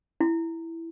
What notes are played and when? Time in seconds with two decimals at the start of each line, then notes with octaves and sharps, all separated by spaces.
0.21 E4